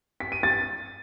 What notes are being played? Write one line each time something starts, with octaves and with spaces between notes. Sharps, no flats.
B6
D#7
A6